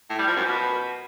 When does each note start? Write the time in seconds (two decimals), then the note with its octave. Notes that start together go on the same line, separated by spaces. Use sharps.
0.10 A2
0.19 G3
0.27 F3
0.36 F#2
0.45 B2